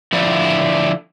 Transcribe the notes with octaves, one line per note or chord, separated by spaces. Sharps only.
D3 F3 E4 D5